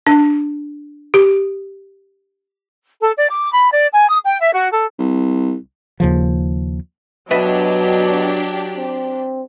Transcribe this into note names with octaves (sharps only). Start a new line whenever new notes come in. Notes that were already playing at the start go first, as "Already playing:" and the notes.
D4
G4
A4
D5
D6
B5
D5
G#5
D#6
G5
E5
F#4
A4
C2
D#2 C#3 F3
B2 F#3 D4 G4 B4 D#5 E5
C4